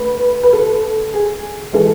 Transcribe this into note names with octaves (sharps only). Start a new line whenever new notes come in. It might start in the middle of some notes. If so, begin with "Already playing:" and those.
Already playing: D2 B4
B4
A4
G#4
E3 G#3 A4